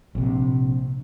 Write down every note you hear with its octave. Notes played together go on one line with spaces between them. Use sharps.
A#1 C3